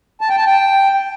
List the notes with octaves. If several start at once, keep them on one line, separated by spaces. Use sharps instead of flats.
A5
G5
A5
G5